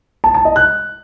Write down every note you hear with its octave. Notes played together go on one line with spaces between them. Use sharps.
A5
A5
D#5
F#6